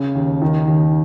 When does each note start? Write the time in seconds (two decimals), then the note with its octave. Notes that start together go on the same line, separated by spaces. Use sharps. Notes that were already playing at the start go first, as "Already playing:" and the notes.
Already playing: C#3
0.15 D#2
0.42 D#3
0.68 D#2